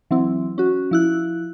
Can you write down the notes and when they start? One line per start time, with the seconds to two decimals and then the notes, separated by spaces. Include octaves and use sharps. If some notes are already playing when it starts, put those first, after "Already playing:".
0.11 E3 F#3 C4 E4
0.58 C#4 F#4
0.91 F3 E4 F#6